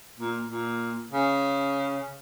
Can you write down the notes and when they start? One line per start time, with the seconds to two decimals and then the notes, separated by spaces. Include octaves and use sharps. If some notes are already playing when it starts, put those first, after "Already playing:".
0.17 A#2
0.48 A#2
1.11 C#3